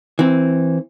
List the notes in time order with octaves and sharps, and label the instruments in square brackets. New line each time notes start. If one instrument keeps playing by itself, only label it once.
[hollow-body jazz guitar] E3 C4